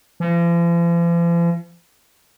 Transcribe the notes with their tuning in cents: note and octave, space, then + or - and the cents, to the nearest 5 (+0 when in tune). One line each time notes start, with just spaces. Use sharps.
F3 -45